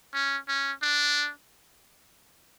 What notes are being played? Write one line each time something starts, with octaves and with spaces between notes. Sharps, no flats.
C#4
C#4
D4